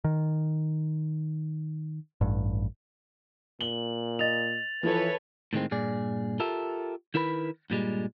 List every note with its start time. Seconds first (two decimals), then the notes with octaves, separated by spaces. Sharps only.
0.04 D#3
2.21 A1 G2
3.61 A#2 F#7 G7
4.19 D#5 A6 F7
4.83 E3 F3 E4 A4 B4 C#5
5.53 A2 D#3 G#3 C4
5.71 G2 A#2 G#4 D5
6.40 F4 G4 A4 A#4 E5
7.14 D#3 E4 A#4 B4 B5
7.70 G2 A#2 G3 G#3